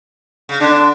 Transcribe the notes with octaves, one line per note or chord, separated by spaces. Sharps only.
C#3
D3 D4